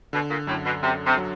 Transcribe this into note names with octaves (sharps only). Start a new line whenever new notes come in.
B2 D3
A#2
F#2 A2
B2
F#2 C3
C3
F#3